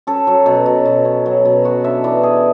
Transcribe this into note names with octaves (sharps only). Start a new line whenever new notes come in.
C#4 A4
F#3
B2
B2
B2
C#4
F#3
B2
B3 F#4
D4 E5
E3 D5
B3 G#4